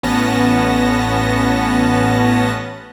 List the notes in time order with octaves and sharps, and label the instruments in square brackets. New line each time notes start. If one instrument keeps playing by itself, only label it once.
[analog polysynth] A1 B3 C#4 A5 A#6